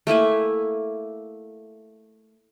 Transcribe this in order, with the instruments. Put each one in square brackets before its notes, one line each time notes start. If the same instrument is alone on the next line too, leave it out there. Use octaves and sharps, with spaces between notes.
[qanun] A3 A#3 E4 G#5